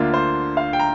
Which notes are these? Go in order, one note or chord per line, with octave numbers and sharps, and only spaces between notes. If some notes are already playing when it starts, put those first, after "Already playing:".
Already playing: D2 D3 A#3 D4 F4
C5
F5
G5
A#5